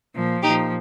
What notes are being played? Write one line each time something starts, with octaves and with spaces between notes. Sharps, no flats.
A#2 F3
A#2 F3 D#4 G4